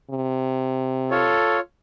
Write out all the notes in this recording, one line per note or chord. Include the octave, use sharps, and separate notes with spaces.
C3
F4 A4 C#5